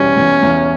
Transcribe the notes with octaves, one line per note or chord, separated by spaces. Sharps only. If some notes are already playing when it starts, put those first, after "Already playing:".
Already playing: E2 B2 G3 C#4
E2
E2